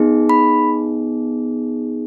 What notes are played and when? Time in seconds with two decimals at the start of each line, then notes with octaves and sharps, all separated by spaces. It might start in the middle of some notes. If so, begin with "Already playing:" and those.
Already playing: B3 D#4 G#4
0.29 B5